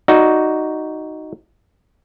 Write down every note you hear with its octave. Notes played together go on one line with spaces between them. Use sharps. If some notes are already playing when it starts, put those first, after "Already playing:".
D#4 F#4 D5